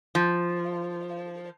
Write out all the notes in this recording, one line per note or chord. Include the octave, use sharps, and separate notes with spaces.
F3